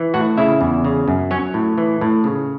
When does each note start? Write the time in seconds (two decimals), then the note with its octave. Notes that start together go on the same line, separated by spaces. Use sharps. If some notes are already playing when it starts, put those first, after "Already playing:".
Already playing: E3
0.14 A2 F#4 F#5
0.37 C#3 E4 E5
0.61 E2
0.84 C#3
1.08 F#2
1.31 F#3 C#4 C#5
1.54 A2
1.78 E3
2.01 A2
2.24 C#3